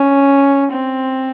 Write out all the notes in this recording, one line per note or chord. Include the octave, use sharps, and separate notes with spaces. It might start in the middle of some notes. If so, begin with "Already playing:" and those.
Already playing: C#4
C4